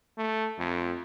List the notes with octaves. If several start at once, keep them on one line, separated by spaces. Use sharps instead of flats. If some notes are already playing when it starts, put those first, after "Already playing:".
A3
F2